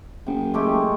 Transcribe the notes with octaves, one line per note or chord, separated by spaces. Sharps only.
F#1 G5
G#3 A3 G4